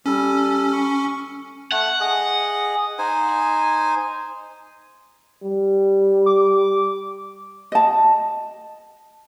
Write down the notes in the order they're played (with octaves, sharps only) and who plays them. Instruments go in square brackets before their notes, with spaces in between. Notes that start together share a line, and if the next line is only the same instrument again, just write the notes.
[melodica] G3 A4 [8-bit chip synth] C#4
[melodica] C#6
[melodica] A3 [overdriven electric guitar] F#5
[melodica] G#4 D#5
D#4 C5 G#5
[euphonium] G3
[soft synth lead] D6
[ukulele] D#5 A5